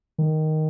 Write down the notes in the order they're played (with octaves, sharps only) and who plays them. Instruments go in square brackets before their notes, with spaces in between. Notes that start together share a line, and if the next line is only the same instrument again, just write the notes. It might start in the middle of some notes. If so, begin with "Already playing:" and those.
[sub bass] D#3